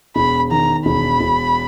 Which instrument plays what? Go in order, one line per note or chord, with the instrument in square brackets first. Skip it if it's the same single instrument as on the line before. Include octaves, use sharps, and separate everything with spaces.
[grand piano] E1 [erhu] B5
[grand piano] D#3 [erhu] A#5
[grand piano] E1 [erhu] B5
[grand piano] E1